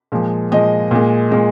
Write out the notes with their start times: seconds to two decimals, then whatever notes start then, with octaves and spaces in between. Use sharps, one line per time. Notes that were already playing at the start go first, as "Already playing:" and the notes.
0.12 A#2 F3 G#3
0.52 A#2 F3 G#3 D#5
0.91 A#2 G#3
1.31 A#2 G#3